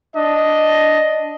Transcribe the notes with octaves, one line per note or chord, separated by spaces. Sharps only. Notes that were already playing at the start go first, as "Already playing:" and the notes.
D4 D#5